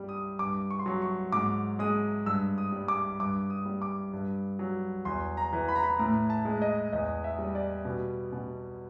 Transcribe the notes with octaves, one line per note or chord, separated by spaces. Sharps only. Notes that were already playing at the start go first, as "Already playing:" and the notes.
Already playing: G2 G3
D#6
G2 D6
C#6
C6
F#3 C#6
C#6
G#2 D6
G#3 D#6
G2 E6
D#6
G3
D6
G2 D6
D#6
G3
D6
G2
F#3
E2 C6
A#5
E3
B5
A#5
B5
A2 A#5
A5
G#3
D#5
E2 D#5
E5
G3
D5
B2
B2